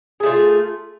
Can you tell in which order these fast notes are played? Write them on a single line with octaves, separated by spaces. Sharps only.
G#4 A3 F4